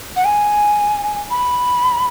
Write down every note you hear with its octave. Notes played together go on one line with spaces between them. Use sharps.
F#5
G#5
B5